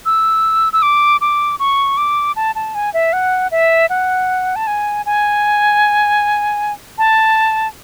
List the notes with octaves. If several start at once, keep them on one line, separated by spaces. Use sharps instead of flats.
E6
E6
D6
D6
C#6
D6
A5
A5
G#5
E5
F#5
E5
F#5
A5
G#5
G#5
A5